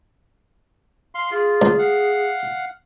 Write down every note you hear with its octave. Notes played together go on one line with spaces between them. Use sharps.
F5 C6
F4 G#4
C#2
F5 F#5